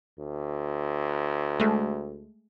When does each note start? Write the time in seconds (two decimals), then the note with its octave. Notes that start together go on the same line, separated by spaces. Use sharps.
0.19 D2
1.60 G#3 A3